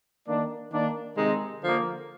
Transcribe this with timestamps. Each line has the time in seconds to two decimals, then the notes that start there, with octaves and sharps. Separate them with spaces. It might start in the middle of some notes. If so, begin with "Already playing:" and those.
0.28 D#3 A#3 D4
0.72 D#3 A#3 D4
1.16 C3 D#3 G#3 C4 D#4
1.62 D3 F3 A#3